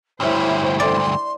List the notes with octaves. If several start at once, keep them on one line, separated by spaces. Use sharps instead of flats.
D2 G2 E4 C5 C#5
D5 C6